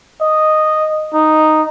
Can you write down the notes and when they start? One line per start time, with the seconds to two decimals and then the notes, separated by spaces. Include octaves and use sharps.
0.21 D#5
1.13 D#4